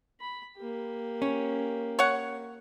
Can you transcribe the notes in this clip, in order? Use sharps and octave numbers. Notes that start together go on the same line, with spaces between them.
B5
A#3 G4
C#4
C#5 F#5